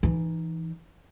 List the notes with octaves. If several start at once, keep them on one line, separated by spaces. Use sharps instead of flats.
E3 D#4